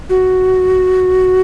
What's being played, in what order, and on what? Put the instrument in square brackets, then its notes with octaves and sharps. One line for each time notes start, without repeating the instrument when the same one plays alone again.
[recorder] F#4